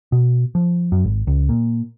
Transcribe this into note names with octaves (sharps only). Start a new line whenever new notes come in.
B2
F3
F#2
G#1
C#2
A#2